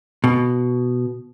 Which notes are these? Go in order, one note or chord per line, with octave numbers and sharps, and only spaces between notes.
B2